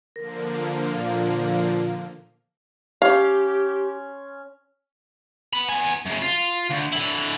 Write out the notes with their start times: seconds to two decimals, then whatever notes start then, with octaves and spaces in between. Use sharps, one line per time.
0.16 D3 F3 A#3 A#4
0.94 A#2 F5
3.02 C#4 G4 F5 C6
5.53 B3 B5
5.69 B3 G#5
6.06 F#2 C#3
6.23 F4
6.71 D2
6.93 D3 E4